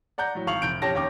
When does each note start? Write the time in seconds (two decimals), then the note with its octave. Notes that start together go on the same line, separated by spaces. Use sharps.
0.18 D5 F#5 A#5 G6
0.35 A2 F#3
0.47 G#1 F5 C#6 F7 F#7
0.62 F1 G6 D7
0.82 F1 C#4 G4 A5 A#6
0.95 D#2 C#4 G5 D6